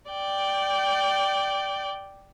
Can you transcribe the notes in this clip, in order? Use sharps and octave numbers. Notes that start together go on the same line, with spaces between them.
D5 G5